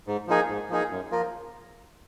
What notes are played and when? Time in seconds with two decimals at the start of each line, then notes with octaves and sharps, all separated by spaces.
0.07 G#2
0.27 F3 A#3 D#4 G#4
0.49 G#2
0.70 F3 A#3 D#4 G#4
0.91 F#2
1.11 F3 A#3 F4 A#4